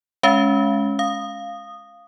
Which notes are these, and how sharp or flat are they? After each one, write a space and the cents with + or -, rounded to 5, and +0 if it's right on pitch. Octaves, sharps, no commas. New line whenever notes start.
G#3 +15 C#4 +0 F5 -40
F5 +0 D#6 -10